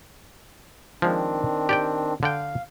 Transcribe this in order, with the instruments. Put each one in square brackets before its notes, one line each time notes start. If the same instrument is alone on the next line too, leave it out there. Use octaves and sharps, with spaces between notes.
[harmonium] D#3 C4 D4 [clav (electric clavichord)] F3 G#3
[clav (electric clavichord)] G4 D5 G5
[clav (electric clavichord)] D3 D5 G5 [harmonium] F5